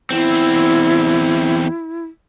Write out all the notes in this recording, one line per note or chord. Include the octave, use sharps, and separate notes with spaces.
E2 C4 E4